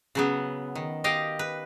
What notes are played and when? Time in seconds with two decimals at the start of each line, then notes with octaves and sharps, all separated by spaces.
0.15 C#3 F#3 B3
0.75 D#3
1.04 G4 D#5 F5 G5
1.39 B4